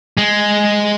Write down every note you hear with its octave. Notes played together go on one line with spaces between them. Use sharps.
G#3